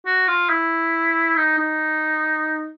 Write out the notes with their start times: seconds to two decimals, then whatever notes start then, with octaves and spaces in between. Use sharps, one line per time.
0.06 F#4
0.28 F4
0.50 E4
1.36 D#4
1.58 D#4